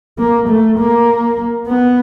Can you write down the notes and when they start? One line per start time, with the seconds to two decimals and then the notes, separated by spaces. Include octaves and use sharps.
0.18 A#3
0.48 A3
0.78 A#3
1.67 B3